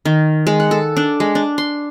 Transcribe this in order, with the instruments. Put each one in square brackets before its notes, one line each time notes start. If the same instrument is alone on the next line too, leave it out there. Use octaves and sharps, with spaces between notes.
[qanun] D#3
G#3
F#5
A4
D4
G#3
D4
C6